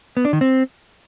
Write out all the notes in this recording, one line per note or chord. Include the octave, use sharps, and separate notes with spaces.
B3
D4
D#3
C4